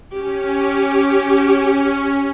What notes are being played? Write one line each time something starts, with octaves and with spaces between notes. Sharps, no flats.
C#4 G4